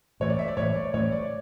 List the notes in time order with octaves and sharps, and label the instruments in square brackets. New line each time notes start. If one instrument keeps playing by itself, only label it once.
[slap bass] A2 E3 A3 [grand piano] C#5
[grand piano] D5
E5
D5
[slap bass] A2 E3 A3 [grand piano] C#5
[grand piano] D5
[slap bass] A2 E3 A3 [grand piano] C#5
[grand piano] D5